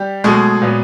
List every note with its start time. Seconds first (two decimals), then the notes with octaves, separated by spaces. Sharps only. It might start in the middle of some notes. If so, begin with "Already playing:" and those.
Already playing: G3 G4
0.24 B2 F#3 G#3 A3 G#4
0.62 A#2 F#3 B3